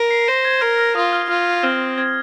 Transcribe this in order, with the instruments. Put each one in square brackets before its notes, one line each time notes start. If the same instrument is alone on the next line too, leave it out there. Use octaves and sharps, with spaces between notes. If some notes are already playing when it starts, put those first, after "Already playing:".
Already playing: [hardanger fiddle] A#4
[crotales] C7
[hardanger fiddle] C5 [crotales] A#6
[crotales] G#6
[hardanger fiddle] A#4 [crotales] F6
[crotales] F6
[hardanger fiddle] F4 [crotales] D#6
[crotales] F6
[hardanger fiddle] F4 [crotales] F6
[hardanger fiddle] C4 [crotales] F6
[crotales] G#6